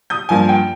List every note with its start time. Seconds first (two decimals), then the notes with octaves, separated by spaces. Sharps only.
0.10 D#6 G6
0.29 G2 F3 A#3 G#5
0.49 G5